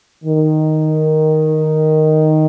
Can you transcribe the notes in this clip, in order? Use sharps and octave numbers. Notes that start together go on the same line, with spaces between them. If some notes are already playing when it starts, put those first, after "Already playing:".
D#3